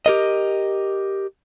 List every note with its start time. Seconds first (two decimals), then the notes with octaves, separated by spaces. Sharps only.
0.06 G4 A#4 D#5